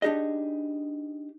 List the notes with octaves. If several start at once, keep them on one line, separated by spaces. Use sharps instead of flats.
D4 D#4 G4 G#4 D#5